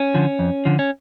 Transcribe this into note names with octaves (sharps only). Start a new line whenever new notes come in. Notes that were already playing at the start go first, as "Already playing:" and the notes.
Already playing: C#4
D3 F3
F2
D3 F3
C#4